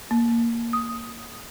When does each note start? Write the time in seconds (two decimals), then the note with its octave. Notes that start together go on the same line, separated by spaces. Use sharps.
0.11 A#3
0.73 D#6